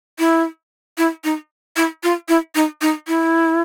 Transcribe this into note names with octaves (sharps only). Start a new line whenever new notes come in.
E4
E4
D#4
E4
F4
E4
D#4
D#4
E4